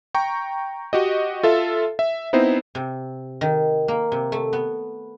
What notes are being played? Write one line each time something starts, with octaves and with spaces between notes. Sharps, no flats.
G5 A#5 C#6
F#4 G4 D#5
F4 A4 E5
E5
B3 C4 D#4 E4 C5
C3
D#3
A#3
C3
A3
B3